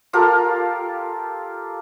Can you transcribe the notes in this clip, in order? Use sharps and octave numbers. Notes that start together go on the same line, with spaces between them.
F4 G4 A4 A#4